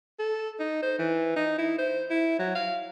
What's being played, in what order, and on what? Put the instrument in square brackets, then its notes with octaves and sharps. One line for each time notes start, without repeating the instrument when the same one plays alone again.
[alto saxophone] A4
D#4
C5
E3
D#4
E4
C5
E4
F#3
F5